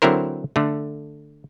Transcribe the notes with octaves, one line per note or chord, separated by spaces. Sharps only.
D3 F#3 C4 E4 A#4 C5
D3 A3